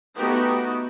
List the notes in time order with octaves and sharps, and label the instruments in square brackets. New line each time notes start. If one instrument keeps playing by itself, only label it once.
[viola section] A3 B3 D#4 F#4 G4